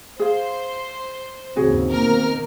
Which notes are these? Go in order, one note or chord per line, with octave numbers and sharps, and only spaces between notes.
G#4 C5 F5
D#2 G#2 C#3 C4 F#4 G#4
B2 D#3 A#3 A#4 F6